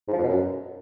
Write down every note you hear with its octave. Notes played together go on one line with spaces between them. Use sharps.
G#2
F3
F2
B2
F#2